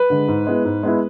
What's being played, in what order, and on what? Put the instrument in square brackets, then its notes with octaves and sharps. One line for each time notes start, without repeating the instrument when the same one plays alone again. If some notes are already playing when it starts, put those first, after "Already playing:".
Already playing: [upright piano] B4
[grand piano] D3 G#3
G#2
G#3 B3 E4
G#2
G#3 B3 E4